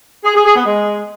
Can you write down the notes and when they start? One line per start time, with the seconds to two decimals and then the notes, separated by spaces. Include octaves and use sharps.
0.24 G#4
0.35 G#4
0.45 G#4
0.55 B3
0.66 G#3